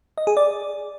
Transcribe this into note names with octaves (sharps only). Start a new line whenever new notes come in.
D#5
G#4
D5